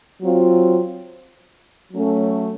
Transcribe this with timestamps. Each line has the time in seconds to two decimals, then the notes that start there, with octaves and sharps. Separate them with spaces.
0.21 F#3 C4 F4
1.92 F#3 A3 C#4